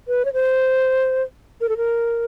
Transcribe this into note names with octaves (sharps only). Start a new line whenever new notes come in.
B4
C#5
C5
A#4
A4
A#4